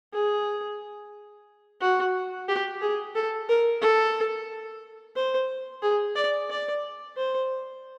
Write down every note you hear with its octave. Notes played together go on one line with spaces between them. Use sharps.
G#4
F#4
G4
G#4
A4
A#4
A4
C5
G#4
D5
D5
C5